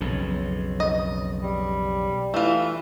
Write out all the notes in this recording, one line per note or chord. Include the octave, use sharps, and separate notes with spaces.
B1 F2 C#3
D#5
G3
E3 A3 F4